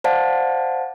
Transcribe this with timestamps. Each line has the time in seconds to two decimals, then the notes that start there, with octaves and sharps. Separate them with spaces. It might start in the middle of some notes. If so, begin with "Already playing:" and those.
0.04 C5 D5 F5 F#5 A5